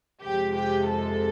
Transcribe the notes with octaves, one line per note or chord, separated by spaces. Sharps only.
F2 C3 F3 G#3 G4
G4
A4